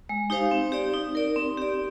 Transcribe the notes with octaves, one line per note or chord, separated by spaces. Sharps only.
G#3
D#4 G4 C5 F5
C4
G4 D5
D#4
A#4 D5
C4
G4 D5